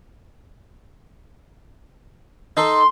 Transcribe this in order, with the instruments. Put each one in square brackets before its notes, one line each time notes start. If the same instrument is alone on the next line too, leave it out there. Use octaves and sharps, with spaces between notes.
[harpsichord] D#4 A4 [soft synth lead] C6